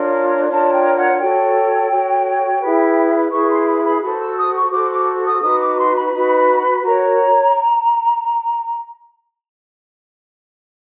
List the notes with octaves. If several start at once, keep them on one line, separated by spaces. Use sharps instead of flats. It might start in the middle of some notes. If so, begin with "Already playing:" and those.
Already playing: D4 F4 A#4 C#5
D4 F4 A#4 C#5 A5
G5
F#5
F#4 A4 C#5 G5
F#4 A4 C#5
E4 G#4 B4
E4 G#4 B4 C#6
C6
B5
B5
F#4 A4 C5 B5
E6
D#6
C#6
F#4 A4 C5 D6
D6
D#6
D#4 F#4 B4 D#6
D6
C6
B5
D#4 F#4 B4
F#4 A#4 C#5 A#5